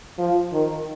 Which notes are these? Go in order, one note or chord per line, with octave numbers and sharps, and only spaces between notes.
F3
D#3